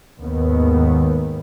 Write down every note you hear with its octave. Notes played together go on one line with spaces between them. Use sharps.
D#2 G#2 D#3 B3